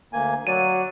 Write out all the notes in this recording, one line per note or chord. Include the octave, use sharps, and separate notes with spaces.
D2 A#3 G#5
F#3 D5 D#7